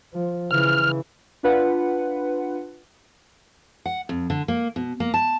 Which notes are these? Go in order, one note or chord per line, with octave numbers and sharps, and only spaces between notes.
F3
C#3 E3 F6
D4 F4 B4 F#5
F#5
F2
D3
A#3
B2
A#3
A5